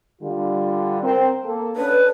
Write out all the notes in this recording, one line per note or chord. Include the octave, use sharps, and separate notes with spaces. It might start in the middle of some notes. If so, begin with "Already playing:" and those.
D3 G3 F4
C4 A#4
A#3 A4
C#4 D4 A4 B4